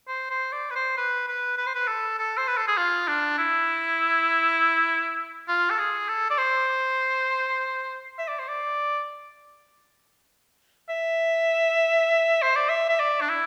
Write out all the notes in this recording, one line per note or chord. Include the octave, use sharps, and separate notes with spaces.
C5
C5
D5
B4
C5
B4
B4
B4
C5
B4
A4
A4
C5
B4
A4
G#4
F4
D4
E4
F4
A4
G#4
A4
D5
C5
E5
D5
C5
D5
E5
C5
D5
E5
E5
D5
D4
E4